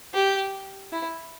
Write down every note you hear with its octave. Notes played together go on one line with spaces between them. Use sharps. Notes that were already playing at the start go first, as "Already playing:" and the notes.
G4
E4